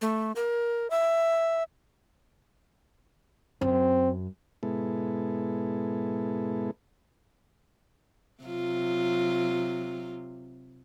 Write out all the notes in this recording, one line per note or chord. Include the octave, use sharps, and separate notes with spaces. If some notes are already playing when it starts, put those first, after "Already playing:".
A3
A#4
E5
F#2 C4
G#2 B2 G#3 B3 E4 A4
C3 F#3 F4